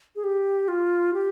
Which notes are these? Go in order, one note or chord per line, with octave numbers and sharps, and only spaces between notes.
G#4
G4
F4
G4